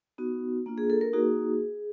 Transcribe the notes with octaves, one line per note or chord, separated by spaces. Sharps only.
B3 D#4 F#4
A#3 D4 F4
G#4
A4
A#4
A#3 D#4 F#4 G#4